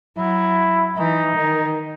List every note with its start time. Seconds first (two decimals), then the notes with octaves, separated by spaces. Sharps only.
0.17 F#3 E4
0.96 E3 D#4
1.36 D#3